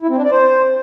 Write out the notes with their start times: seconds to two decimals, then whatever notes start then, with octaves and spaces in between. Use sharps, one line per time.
0.02 E4
0.10 C4
0.17 D4
0.24 D5
0.31 C5